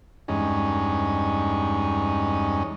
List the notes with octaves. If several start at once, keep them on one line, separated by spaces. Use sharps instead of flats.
E2 G2 G#3 C#4 D#4